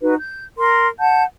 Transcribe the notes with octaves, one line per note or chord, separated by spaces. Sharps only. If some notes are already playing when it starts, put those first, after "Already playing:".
D#4 F#4 B4
G6
A#4 C6
F#5 A5 G6